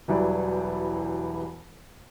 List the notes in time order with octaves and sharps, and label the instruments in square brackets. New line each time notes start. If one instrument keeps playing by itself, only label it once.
[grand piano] E1 E3 F#3 G3 D5